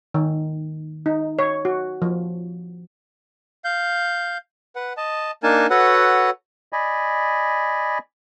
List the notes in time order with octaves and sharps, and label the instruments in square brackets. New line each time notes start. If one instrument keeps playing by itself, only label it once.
[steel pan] D#3
D#4
C#5
F#4
F3
[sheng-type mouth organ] F5 G6
B4 F#5
D#5 A5
A#3 D4 D#4 A#4 G#5 A5
F#4 A4 B4 C#5 F#5
[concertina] D5 D#5 G#5 B5